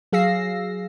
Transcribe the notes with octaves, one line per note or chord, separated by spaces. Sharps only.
F#3 G#4 F5 E6 A#6 C7